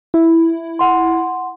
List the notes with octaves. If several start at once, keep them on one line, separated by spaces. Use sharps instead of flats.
E4
F#5 C6